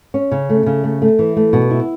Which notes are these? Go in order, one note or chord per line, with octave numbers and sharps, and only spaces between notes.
C#4
C#3
A3
C#3
A3
A3
E3
A3
B2
E4